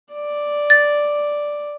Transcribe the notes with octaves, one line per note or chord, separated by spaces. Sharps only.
D5
A6